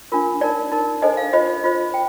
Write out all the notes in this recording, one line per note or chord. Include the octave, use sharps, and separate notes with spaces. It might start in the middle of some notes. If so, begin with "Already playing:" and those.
D4 F4 A#4
D#4 A#4 D5
D#4 A#4
D4 A4 C5 D#5
F5
F4 C5 D#5
F4 C5
G5